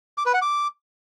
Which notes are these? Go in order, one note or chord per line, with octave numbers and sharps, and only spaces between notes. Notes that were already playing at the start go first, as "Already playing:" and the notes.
D6
B4
F#5
D6